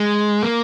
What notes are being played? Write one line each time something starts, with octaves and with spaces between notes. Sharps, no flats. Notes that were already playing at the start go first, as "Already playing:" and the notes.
Already playing: G#3
A#3